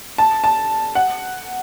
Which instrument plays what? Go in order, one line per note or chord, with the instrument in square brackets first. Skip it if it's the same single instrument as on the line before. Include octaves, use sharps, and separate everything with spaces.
[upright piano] A5
A5
F#5